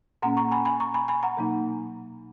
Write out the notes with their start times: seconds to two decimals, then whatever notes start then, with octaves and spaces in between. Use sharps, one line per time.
0.22 A#2 A#3 C#4 F#5 A#5
0.37 A#5 C#6
0.52 G#5 B5
0.65 G#5 B5
0.80 A#5 C#6
0.94 G#5 B5
1.08 G#5 B5
1.23 F#5 A#5
1.37 B2 F#3 A#3 D#4